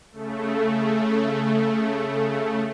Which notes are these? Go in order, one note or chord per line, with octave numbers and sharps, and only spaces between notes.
C#3 A3